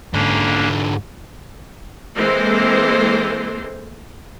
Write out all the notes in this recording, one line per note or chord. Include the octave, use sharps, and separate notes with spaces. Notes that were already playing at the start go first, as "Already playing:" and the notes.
G#2 D3 A#3 C#4 D4
E3 G#3 A#3 C4 A4 C5